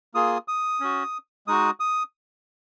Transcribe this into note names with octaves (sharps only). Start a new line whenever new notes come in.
A#3 F4 G#4 D#6
D#6
C#4 F#4
G#3 D#4 F#4 D#6
D#6